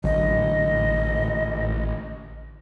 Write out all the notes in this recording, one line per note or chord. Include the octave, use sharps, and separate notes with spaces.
A1 D3 F#3 D#5